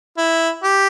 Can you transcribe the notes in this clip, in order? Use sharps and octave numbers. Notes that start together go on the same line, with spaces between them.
E4
G4